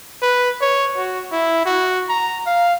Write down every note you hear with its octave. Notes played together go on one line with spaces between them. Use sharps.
B4
C#5
F#4
E4
F#4
A#5
F5